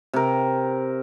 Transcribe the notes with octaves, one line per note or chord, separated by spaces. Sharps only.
C3 A#4